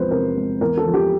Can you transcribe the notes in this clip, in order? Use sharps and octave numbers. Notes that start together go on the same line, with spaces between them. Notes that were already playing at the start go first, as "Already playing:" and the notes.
Already playing: E2 C3 F3 G#3 B4 C5
C3 A#4
G#3
E2 A#4
A4
F3
G4